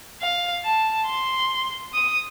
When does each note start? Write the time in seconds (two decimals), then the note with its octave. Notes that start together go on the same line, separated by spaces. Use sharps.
0.21 F5
0.64 A5
1.07 C6
1.94 D#6